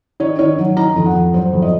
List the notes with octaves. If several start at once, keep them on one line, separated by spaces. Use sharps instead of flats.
D#3 C#5
D#3 C#5
F#3
D#3 A#5
F2
F#5
F2
F#3 C5
F2
D#5